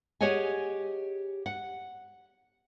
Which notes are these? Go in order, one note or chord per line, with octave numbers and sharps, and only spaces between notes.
G4 G#4 C#5 D#5 F#5 G#5
F#5